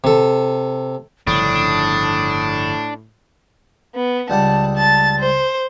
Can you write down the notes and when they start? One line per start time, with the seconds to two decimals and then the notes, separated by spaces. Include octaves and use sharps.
0.04 C3 A4
1.27 G1 A2 C#3 F3 D4 D#6
3.95 B3
4.30 C#2 G3 F#5 A5
4.76 A5 A6
5.19 C5